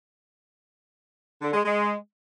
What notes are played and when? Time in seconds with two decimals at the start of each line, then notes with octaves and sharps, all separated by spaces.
1.42 D3
1.54 G#3
1.65 G#3